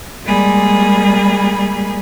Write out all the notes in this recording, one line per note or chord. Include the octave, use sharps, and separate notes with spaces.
G3 G#3 A#3 G#4 B5